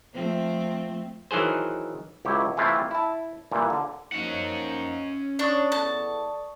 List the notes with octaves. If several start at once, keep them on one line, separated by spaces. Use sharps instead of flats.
F3 A3 C4
D#3 E3 F#3 G#4 C5
C#2 F#3 E4 G4 C#5
C3 E3 A3 C4 E4 F4
E4 A5
A#2 E3 G3
D3
F3 A#3 C#4 D#4 F#5
D4 C#5 D5 C#6 D#6
E2 B3 A4 A5